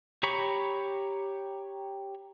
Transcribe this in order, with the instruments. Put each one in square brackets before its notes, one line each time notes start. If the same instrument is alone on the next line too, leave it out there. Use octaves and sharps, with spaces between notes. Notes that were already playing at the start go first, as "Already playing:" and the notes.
[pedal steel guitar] G4 C#5 A#5 B5 C#6